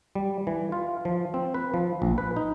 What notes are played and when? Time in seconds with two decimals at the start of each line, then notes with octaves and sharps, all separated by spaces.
0.15 G3
0.47 E3
0.72 F4
1.05 F3
1.34 C4
1.54 B4
1.74 F3
2.02 A#1
2.18 B4
2.36 D#4